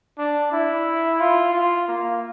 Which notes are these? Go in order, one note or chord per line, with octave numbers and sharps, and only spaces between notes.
D4
E4
F4
F4
A#3